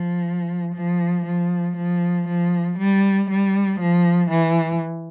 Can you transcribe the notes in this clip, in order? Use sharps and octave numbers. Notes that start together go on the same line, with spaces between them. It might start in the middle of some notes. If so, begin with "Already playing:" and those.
Already playing: F3
F3
F3
F3
F3
G3
G3
F3
E3